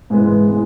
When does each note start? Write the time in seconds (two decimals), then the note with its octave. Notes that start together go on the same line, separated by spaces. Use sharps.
0.10 G#2 E3 G#3 B3
0.49 E3 G#3 B3